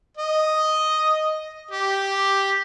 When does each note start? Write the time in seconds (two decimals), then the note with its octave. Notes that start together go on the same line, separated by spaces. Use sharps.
0.17 D#5
1.71 G4